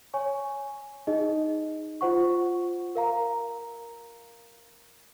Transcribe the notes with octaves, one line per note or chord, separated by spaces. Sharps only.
C#5 G#5 C#6
D#4 G#4 D#5
F4 C5 F#5 C#6
A#4 F5 A#5